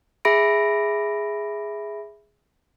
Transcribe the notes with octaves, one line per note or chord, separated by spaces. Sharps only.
G#4 E5 B5 A#6 D7